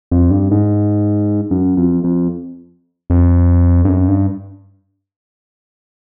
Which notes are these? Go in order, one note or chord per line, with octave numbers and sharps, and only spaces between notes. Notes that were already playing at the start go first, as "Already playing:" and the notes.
F2
G2
G#2
F#2
F2
F2
F2
G2
F#2
G2